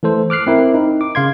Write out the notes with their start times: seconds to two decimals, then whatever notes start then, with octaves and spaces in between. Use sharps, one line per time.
0.03 E3 A3 A4 C5
0.30 D6 F6 F#6 C7
0.47 C4 E4 A#4
0.74 D#4
1.01 D6
1.15 C#3 F5 C6 G#6